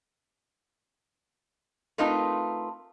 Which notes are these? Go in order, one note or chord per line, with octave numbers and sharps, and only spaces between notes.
A3 C4 D#4 F4 A#4 B4